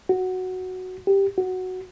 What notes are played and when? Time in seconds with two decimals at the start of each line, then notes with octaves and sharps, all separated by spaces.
0.09 F#4
1.07 G4
1.38 F#4